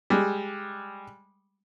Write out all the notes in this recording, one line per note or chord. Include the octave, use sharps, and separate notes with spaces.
G3 G#3